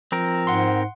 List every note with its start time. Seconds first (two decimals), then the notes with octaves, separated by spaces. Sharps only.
0.12 F3 C4 A#4
0.47 G#2 F#5 C6